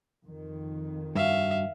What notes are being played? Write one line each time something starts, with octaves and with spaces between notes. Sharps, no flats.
F2 D#3
G2 F#4 E5 F5